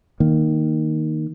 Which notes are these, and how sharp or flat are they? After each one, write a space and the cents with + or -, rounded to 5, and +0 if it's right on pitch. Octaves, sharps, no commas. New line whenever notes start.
D#3 +0 A#3 +0